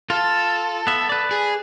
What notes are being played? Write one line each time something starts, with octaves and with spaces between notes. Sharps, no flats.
F4 A4
B3 E5
B4 D5
G#4